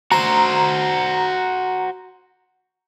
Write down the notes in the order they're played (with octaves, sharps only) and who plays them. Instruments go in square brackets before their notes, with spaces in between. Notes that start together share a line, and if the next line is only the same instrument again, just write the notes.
[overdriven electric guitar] F#4 C5 [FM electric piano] A#5